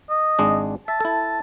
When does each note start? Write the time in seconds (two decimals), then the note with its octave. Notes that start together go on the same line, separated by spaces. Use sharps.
0.10 D#5
0.39 G#1 G#3 D4
0.88 E5 A5
1.00 E4 A4